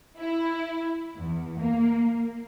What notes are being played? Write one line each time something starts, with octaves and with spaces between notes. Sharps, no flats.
E4
E2
A#3